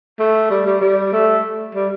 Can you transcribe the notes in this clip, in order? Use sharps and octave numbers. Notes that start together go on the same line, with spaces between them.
A3
G3
G3
G3
A3
G3